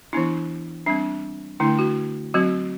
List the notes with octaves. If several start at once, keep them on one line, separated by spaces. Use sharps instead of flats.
E3 B3 D4 E4
G3 C4 D4
D3 A3 D4 E4
F#4
F#3 C4 F#4